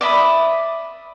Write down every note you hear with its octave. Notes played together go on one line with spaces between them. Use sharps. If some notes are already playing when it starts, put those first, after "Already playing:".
D5 E5 B5 D#6